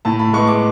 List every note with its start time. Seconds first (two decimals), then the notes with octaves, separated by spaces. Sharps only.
0.05 A2 A5
0.19 B5
0.33 G#3 B3 C#6
0.47 D6